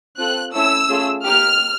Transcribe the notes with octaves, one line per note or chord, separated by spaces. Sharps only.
C4 F4 A4 F#6
A3 C#4 E4 A4 E6
A3 C#4 F4 G#4
A#3 D#4 G4 F6